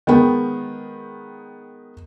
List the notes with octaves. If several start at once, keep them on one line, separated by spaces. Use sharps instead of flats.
D#3 G#3 B3 G5